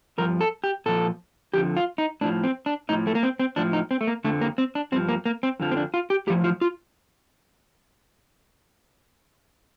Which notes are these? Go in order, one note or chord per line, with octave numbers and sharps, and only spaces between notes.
G2 F3 A#4
A4
G4
A#2 F3 A4
F2 D3 F3 G4
F4
D#4
A2 F3 D4
C4
D4
A2 F3 D#4
A3
A#3
C4
C4
A2 F3 D4
D#4
C4
A3
A#3
F2 D3 F3 A3
A#3
C4
D4
G2 F3 C4
A#3
A#3
C4
F2 D3 F3
C4
D4
F4
G4
A2 F3 G4
F4
F4